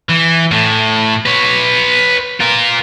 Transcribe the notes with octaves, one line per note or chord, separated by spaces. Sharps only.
E3
A2
B4 C#5
F4 A#4